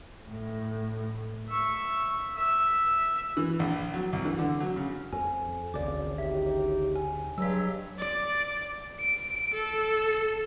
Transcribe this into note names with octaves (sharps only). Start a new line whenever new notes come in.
A2
E5 C#6
E5
E3
A#1
F#3
C2
E3
D3
F#3
C#3
F2 G#5
G#1 D2 C#3 D5 D6
D#3 D#4 G4 E5
G#5
G2 F#3 G#3 E6 B6
D5
D7
A4